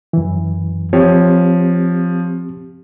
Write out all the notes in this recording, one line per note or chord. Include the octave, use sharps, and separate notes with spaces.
F#2 E3
F3 C4 G4 C#5